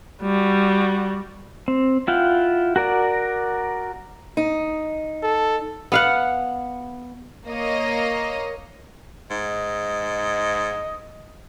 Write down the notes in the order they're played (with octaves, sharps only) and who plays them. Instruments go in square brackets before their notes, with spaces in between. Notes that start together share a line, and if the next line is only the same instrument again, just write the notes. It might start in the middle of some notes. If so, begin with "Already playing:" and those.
[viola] G3 F#4
[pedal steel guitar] C4
E4 F4 F#5 G5
F#4 A#4 D5
[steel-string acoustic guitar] D#4
[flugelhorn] A4
[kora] B3 F5 F#5
[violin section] A#3 C#5 D#5
[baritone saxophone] G#2 [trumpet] D#5